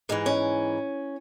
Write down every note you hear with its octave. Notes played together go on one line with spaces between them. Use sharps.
G#2 E3 G#3
C#4